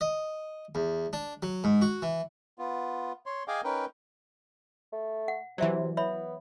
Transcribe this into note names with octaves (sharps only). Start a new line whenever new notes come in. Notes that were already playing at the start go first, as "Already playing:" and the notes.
D#5
E2
D4
F#3
G#2
F#4
E3
B3 F4
C#5 C6
G#4 D#5 F5 G5 G#5 D6
C#4 D#4 A#4 B4 G5
A3
F#5
C3 E3 F#3 D5 E5
B3 C#5 E5 B5